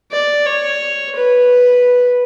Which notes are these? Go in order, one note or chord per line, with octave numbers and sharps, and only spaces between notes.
D5
C#5
B4